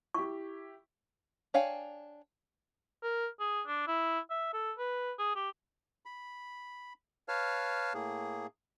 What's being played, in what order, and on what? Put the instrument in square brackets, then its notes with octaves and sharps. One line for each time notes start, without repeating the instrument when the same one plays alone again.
[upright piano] E4 G4 [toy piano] C#6
[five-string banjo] D4 C#5 F5 G5 G#5
[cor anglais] A#4
G#4
D4
E4
E5
A4
B4
G#4
G4
[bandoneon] B5
B4 C#5 F5 A5 F6
A2 A#3 G#4